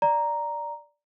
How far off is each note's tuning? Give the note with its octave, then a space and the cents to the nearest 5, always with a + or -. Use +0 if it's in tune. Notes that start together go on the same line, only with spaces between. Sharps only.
D5 +0 A#5 +0